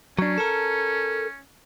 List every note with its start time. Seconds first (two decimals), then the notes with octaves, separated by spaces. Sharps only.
0.19 F#3 C#4 D4
0.38 A4 A#4